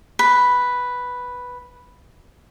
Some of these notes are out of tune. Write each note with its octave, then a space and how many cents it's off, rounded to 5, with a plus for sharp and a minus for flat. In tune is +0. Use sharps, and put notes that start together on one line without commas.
B4 +0 B5 +0